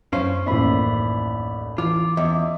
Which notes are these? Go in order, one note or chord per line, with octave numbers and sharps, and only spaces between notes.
F#2 C#4 C5 F5 C7
A1 D#2 D5 E5 B5
E3 F4 D6
E2 D#5 E5